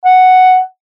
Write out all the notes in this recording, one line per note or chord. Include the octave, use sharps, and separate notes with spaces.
F#5